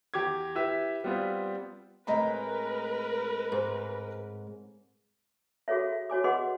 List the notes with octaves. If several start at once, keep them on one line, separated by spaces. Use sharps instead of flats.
E2 G4 D6 G#6
E4 G4 B4 E5
G3 B3 C4 F4
A2 G#3 C4 A#4 B4 D#5 A#5 B5
G#2
F#4 G#4 A4 C#5 E5
E5
F#4 C#5 G#5 D6
G#4 B4 D#5 F#5 C6 D6